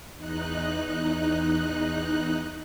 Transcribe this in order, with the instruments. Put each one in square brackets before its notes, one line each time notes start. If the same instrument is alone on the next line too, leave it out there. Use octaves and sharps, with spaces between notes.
[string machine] E2 D#4 F#6